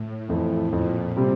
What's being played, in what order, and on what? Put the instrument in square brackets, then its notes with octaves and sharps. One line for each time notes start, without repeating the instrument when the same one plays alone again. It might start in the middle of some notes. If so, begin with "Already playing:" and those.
Already playing: [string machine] A2
[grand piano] F2 E3 A3
[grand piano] F2 [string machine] A#2
[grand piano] C3 G3 C4